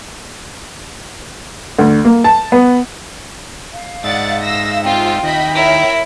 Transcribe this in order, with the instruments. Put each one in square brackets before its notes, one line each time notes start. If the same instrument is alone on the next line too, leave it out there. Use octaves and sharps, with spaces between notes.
[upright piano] D2
A#3
A5
B3
[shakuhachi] F5
[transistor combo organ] G#2 D#4 E5 [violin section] D5 F#5 A6
[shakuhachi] F5 [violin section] E6 A#6
[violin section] C4 F4 [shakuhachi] G5
[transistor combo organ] D#2 D#3 [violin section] D#5 E5 B5
[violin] E4 [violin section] A#4 C#5 E5